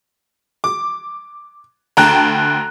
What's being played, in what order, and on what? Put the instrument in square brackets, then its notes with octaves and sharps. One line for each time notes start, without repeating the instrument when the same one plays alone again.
[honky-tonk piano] D6
[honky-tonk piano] D2 G5 A5 [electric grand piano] A#5 F#6